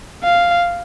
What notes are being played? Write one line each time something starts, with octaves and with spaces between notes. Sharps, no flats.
F5